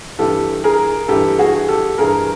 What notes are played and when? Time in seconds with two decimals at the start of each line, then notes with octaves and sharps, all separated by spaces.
0.19 G2 E3 G4 A4
0.64 G#4 A#4
1.08 G2 E3 G4 A4
1.39 F#4 G#4
1.69 G4 A4
1.98 G2 E3 G#4 A#4